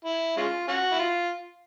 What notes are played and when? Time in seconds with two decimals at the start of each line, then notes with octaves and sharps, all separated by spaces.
0.05 E4
0.37 G#3 C#4 F4
0.68 C#4 F#4
0.92 E4
0.99 F4